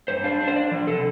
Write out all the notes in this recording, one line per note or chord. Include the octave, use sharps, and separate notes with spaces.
G2 C5
D4 F5
D4
C5
D4 D5
F3
C3 A4